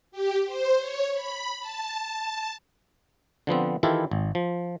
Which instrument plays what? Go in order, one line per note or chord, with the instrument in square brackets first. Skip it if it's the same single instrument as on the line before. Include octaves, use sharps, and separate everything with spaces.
[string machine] G4
C5
C#5
B5
A5
A5
[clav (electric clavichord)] D3 F3 B3 C4
D#3 E3 E4 F4 G4 A4
G#1
F3